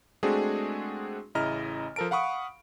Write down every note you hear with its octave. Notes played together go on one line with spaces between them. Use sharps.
G#3 A3 C4 D4 F#4 G#4
A1 C#3 E4 D#5 A#5 F6
F3 A4 A#4 A5 D7
F5 F#5 B5 C#6 D#6